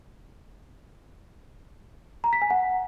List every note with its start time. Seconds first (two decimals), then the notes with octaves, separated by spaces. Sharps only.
2.24 A#5
2.33 B6
2.42 G#5
2.50 F#5